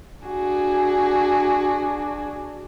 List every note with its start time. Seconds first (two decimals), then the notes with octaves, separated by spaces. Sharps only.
0.24 D4 F#4 G#4